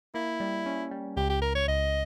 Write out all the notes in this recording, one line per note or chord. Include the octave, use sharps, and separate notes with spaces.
A#3 E4
G3
C#4
G3
C#2 G4
G4
C#2 A#4
C#5
C#2 D#5